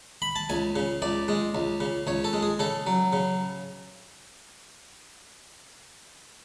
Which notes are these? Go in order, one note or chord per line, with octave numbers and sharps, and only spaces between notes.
B5
A5
C#2 G#5
C#3
C#2 D5
G#3
C#2
C#3
C#2 C#5
A4
G#3
G#4
C#3 A4
F#3
C#3